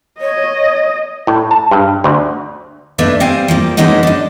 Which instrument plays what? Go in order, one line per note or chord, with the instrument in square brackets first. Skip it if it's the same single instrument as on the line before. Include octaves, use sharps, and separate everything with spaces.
[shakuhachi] C#5 [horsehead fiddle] D#5
[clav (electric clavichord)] A2
A5
G2
D2
[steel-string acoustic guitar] A3 A#3 D4 D#4 B4 E5
G3 C4 F5 G#5
F3 G3 A#3
E3 G#3 A#3 C#4 D#4 F#4
D4 D#4